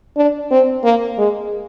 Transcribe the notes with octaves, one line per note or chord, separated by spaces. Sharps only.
D4
C4
A#3
G#3